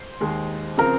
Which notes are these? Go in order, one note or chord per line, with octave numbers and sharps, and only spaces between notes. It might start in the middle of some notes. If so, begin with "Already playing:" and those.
Already playing: C5
D#2 D#3 G#3
C#3 F3 C4 A#4